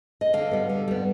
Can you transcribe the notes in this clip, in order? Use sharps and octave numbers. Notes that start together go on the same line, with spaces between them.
D#5
D3 F5
G3 B3
D3
G3 B3